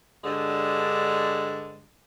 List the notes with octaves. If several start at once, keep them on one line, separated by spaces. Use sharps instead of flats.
G2 D3 G#3